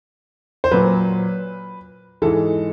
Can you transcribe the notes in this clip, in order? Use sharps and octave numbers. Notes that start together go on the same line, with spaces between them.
C5
A#2 F#3 B4
G#2 E3 G#3 A4